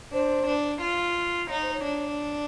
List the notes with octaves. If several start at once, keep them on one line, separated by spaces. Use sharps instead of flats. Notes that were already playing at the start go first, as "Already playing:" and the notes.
D4 C5
D4
F4
D#4 C#5
C5
C#5
D4